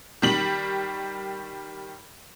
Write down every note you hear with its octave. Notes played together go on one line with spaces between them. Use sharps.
D#3 G3 F#7